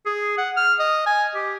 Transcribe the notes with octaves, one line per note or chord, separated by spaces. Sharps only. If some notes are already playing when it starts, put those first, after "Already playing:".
G#4
F#5
F6
D#5
G#5
G4